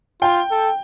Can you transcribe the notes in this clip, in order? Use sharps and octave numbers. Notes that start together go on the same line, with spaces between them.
F4 G5
A4